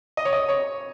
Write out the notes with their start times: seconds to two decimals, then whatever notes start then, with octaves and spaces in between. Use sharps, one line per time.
0.17 D#5
0.25 C#5
0.33 D#5
0.49 C#5